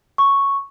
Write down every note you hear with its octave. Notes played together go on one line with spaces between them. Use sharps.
C#6